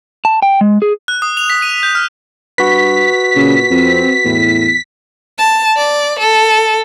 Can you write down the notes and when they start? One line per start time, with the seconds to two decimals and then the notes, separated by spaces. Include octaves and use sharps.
0.25 A5
0.42 G5
0.61 G#3
0.82 G#4
1.08 F#6
1.22 D#6
1.37 F7
1.50 B6
1.62 D#7
1.83 G6
1.95 F6
2.58 G2 F#4 B4 B6
3.36 A#2 C#3
3.70 F2 C4
4.25 E2 A2
5.39 A5
5.77 D5
6.19 A4